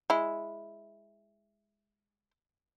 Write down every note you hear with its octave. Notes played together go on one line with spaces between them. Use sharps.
G#3 E4